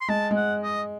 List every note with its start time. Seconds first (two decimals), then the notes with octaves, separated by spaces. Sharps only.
0.01 C6
0.08 G#3 A5
0.31 G#3
0.36 F#5
0.63 D#5